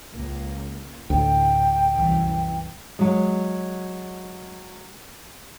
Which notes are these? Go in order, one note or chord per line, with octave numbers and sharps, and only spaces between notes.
C#2 A#3
D2 A2 G5
C2 F#2 E3
F#3 G#3